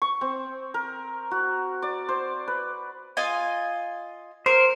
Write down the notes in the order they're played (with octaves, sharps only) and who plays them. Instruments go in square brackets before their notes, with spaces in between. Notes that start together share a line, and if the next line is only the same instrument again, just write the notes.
[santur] C#6
C4
A#4
F#4
D5
C5
B4
[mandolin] F4 D#5 G#5
[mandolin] A#4 [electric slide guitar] C5